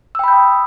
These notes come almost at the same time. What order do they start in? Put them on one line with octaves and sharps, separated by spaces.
E6 G5 B5 G6 D#6